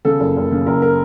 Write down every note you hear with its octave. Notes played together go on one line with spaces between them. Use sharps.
C#3 A4
F#1
F#1
C#3
F#1 A#4
A#4